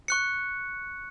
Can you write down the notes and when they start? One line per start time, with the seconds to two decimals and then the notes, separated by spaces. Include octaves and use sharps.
0.08 C#6 F#6 C#7